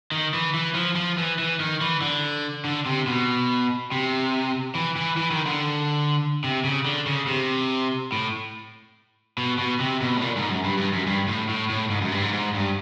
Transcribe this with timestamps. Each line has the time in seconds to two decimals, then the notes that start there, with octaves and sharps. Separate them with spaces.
0.12 D#3
0.34 E3
0.54 E3
0.75 F3
0.96 F3
1.18 E3
1.39 E3
1.60 D#3
1.81 E3
2.02 D3
2.65 D3
2.86 C3
3.07 B2
3.92 C3
4.75 E3
4.96 E3
5.17 E3
5.31 D#3
5.46 D3
6.44 C3
6.64 C#3
6.85 D3
7.07 C#3
7.27 C3
8.12 A2
9.38 B2
9.59 B2
9.80 C3
10.02 B2
10.17 A2
10.22 A#2
10.37 G#2
10.50 F#2
10.64 G2
10.78 G2
10.93 F#2
11.07 G2
11.28 A2
11.49 A2
11.70 A2
11.90 G#2
12.01 F#2
12.12 G2
12.22 G#2
12.33 G#2
12.54 G2